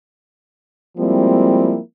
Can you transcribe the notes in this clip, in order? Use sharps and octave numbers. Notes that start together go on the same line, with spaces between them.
F3 G3 G#3 A#3 C4 E4